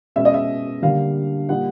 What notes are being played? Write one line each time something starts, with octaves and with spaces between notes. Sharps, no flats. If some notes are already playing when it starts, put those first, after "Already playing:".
B2 G#3 C#4 E5
D#5
E5
D3 G3 A#3 F5
A#2 G3 A#3 D#4 F#5